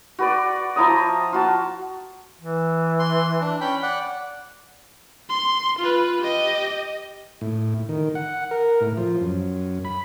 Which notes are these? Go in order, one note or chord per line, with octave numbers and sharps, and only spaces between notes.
F#4 B4 D5
F3 E4 A#5 D#6
F4 F#4 A5
E3
C6
D4
C#4 G5 B5
D5 F#5
C6
F4 B4
G4 D#5
A2
D#3
F#5
A#4
A2
F3
F#2
B5